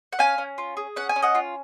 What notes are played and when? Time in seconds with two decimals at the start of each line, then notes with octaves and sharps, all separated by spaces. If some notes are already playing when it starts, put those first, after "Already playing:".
0.12 F#5
0.19 C#4 F5 G#5
0.38 C#4
0.58 F4
0.77 G#4
0.96 C#4 F#5
1.09 G#5
1.16 C#4
1.22 D#5 F#5
1.35 F4